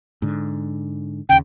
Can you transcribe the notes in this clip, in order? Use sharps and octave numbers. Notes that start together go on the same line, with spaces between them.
G#2 D3
D#2 C#3 G5